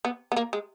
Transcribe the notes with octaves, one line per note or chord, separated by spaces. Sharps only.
B3
B3
A#3
G#3